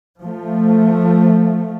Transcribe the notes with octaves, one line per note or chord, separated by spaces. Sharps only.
F3 A3